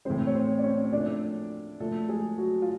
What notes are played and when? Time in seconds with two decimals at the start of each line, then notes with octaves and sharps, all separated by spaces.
0.05 A2 E3 G#3 C4 C5
0.27 C#5
0.35 C4 C5
0.58 D5
0.63 C#4 C#5
0.84 C#5
0.92 A#2 F3 A3 D4 D5
1.80 A#2 F3 A3 A4
2.08 G#3 G#4
2.38 F#3 F#4
2.62 F4